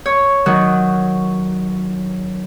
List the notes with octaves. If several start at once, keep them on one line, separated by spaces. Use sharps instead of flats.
C#5
D#3 F#3 F#4